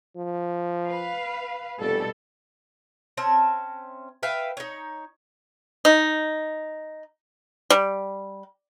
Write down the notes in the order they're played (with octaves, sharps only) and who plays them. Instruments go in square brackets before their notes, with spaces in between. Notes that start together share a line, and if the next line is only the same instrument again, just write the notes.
[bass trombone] F3
[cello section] B4 F5
[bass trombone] F1 [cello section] B2 G3 A4
[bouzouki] C4 C#4 E5 A5
B4 E5 F5 G5
D#4 C#5
[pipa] D#4
G3